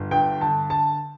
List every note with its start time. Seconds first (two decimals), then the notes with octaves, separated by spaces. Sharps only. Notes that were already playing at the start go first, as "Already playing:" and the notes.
Already playing: G1
0.11 G2 G5
0.41 D3 A5
0.70 A5